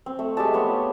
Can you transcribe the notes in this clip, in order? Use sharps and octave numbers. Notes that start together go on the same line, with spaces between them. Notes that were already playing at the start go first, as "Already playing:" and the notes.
C4
A3
G#3 G4 E5 A5
A3 B3 C#5
F4